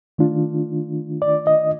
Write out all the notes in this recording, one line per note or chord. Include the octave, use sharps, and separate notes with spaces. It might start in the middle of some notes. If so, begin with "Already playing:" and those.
D#3 A3 D4 F4
D5
D#5